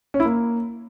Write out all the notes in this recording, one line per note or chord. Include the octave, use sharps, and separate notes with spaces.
C#4
E4
A#3